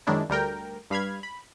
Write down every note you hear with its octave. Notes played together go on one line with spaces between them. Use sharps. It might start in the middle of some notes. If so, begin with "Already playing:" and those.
F#2 D#3 G#3 D4 E4
D2 G3 A#4 G5
G2 F5 B5 F6 G#6
B5